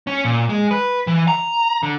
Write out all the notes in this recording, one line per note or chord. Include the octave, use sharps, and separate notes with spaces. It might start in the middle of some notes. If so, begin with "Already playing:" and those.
C#4
A#2
G#3
B4
E3
A#5
D3